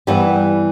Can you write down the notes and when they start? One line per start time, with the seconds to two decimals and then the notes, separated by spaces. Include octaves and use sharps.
0.07 G2 E3 G3 B3